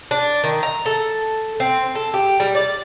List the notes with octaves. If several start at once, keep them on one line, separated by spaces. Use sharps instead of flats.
D4
D#3
A#5
A4
C4
A4
G4
G3
D5